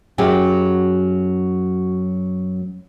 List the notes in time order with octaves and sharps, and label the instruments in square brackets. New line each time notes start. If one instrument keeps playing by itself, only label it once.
[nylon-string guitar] F#2 F#3 G4 G#4